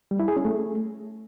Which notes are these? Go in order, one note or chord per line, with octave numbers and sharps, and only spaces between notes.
G3
E4
G#4
C#4
A3